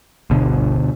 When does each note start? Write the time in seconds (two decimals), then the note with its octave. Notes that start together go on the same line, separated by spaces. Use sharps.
0.30 G1 D2 B2 D3